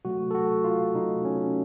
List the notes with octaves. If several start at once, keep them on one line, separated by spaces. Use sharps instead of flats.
C3 F#3 A3 F#4
A4
F#4
F4
C3 F#3 A3 D#4
C#4